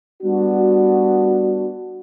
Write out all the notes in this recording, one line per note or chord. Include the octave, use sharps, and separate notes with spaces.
G3 B3 D4 F#4